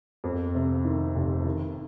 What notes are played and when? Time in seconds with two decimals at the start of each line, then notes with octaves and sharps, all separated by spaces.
0.24 F2
0.55 C3
0.85 D#3
1.16 F1
1.45 D#3